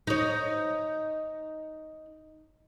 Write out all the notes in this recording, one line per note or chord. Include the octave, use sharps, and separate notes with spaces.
D#4 C#5